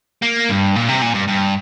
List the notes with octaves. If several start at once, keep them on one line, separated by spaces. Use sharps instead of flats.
A#3
G2
A#2
C3
A#2
G2
G2